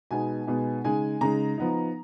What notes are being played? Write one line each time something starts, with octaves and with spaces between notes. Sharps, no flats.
B2 G#3 B3 D#4 G#5
B2 G#3 B3 D#4
C#3 G#3 D#4 G#5
C#3 G#3 D#4 A#5
F3 B3 D#4